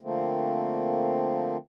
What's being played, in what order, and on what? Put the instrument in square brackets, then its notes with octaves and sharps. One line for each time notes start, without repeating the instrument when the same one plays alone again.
[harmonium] D3 F3 A3 A#3 C4